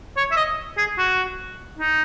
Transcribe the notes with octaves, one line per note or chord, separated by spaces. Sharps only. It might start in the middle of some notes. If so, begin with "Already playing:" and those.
C#5
E5
D#5
G#4
F#4
D#4